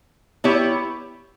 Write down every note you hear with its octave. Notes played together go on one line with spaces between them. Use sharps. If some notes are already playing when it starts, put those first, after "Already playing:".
B3 E4 G4 C#5